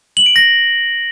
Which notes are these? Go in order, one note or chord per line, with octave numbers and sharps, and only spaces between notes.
F#7
D7
A#6